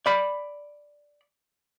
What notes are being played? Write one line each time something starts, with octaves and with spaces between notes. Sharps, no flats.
D5 B5